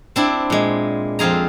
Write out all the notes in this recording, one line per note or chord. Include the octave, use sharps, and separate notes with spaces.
C4 D4 E4
A#2 G#3
F2 C4 F4 G#4 A#5